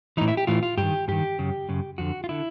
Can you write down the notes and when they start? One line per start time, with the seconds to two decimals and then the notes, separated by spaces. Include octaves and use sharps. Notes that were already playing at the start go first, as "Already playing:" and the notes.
0.17 A2 E3 D#4
0.28 E4
0.37 G4
0.47 A2 E3 F4
0.63 F4
0.77 G2 G4
0.83 D#3
1.08 G2 D#3 G4
1.39 F#2 C#3
1.69 F#2 C#3
1.98 F2 D3 F#4
2.24 F4
2.29 D3 E4